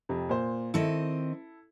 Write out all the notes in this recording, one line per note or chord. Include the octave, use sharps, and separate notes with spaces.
F2 C3
A#2 C5
D#3 C4 E4 A4 D#5